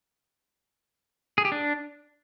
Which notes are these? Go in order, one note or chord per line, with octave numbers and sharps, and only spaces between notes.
G#4
G4
D4